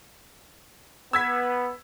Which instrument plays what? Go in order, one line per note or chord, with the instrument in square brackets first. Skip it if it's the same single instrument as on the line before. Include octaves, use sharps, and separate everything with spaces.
[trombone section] B3 [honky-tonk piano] E6 G#6 B6